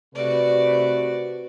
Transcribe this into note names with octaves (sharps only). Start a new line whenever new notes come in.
C3 A3 F#4 B4 D5